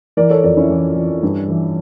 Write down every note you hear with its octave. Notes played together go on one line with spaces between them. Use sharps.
E3 A#4 D5
A4 C#5
F2 A#4 D5
C#4 E4
E3
E3
G2
E3